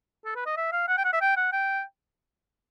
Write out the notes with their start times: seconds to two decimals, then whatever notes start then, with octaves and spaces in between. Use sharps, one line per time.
0.25 A4
0.35 B4
0.46 D#5
0.57 E5
0.73 F5
0.88 F#5
0.97 G5
1.05 F#5
1.13 E5
1.22 G5
1.37 F#5
1.53 G5